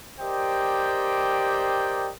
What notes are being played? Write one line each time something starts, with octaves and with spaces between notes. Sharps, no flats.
G4 A#4 C5 D5 D#5 G5